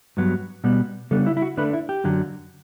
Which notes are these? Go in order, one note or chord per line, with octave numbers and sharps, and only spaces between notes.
G2 F#3 B3
B2 G3 B3
C#3 G3 B3 D4 A4
E4
E4
F#4
D3 A3 D4 B4
E4
G4
F#2 D3 F#3